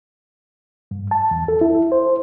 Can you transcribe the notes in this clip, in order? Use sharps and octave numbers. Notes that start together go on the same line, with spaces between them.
G2
A5
E2
A4
E4
C5